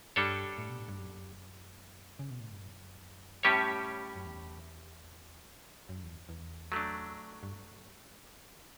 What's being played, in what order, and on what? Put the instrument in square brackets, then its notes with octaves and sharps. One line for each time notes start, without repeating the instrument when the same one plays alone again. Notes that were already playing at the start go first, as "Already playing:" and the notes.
[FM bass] G2 [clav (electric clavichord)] G3 D4 A4 C#5
[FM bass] A2
B2
A2
G2
F#2
C#3
B2
A2
G2
F#2
[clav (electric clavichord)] A2 G3 C#4 G4 C#5
[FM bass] F#2
E2
F#2
E2
E2
[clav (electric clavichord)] F#3 A3 D4
[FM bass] G2